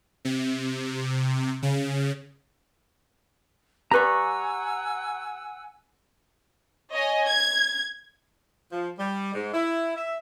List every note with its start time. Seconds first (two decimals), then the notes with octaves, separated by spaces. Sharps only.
0.25 C3
1.62 C#3
3.91 G4 B4 D5 F#5 G#5 A#5 C#6 E6
6.91 C#5 D#5 G#5
7.29 G#6
8.72 F3
8.99 G3
9.34 G#2
9.53 E4
9.96 E5